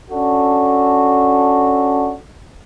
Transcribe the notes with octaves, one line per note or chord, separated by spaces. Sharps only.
C#4 D4 F#4 A4